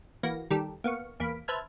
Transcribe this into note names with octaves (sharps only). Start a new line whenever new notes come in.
E3 A#3 F#4 A#6
D#3 G3 G4 A4
A#3 B3 F5 C#6
E2 A#3 F5 B5 D7
B4 C5 E5 A5 F6 G#6